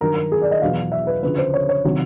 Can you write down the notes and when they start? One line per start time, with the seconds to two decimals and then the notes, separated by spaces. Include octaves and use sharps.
0.01 G2 D#3 F#3 A#4
0.16 A#4
0.32 G#4
0.42 D5
0.51 D#5
0.62 E2 B2 F#3 F5
0.92 E5
1.07 B4
1.23 D2 C#3 F3 B4
1.38 C5
1.54 C#5
1.69 C#5
1.84 C3 D#3 F#3